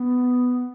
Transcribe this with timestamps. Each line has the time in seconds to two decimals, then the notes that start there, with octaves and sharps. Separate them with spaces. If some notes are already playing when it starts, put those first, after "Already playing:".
Already playing: B3